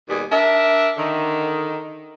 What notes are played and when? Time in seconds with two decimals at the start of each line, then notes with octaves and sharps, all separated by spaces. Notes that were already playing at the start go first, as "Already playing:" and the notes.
0.09 D#2 B2 G3 G#4
0.31 D4 A#4 E5
0.97 D3 D#3